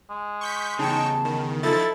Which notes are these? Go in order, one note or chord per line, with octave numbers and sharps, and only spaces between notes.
G#3
C#6 G6 B6
E2 C#3 D#4 G5 A5 C#6
D#3
F3 D#4 E4 A4 A6